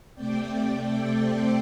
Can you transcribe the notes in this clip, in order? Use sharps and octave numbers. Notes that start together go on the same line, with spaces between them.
C3 A3 C4 D5 G5
D5 G5
A4 D5
C5